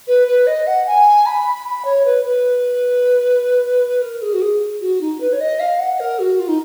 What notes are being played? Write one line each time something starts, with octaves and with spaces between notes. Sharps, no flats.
B4
B4
D#5
F#5
G#5
B5
B5
C#5
B4
B4
A#4
G#4
F#4
G#4
F#4
D#4
B4
C#5
D#5
F5
F#5
A#4
F#4
F4
D#4